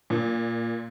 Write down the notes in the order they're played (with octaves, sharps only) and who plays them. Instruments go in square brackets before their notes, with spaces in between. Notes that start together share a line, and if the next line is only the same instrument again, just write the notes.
[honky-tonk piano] A#2